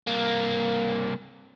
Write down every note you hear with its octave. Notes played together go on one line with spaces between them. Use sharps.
C2 A#3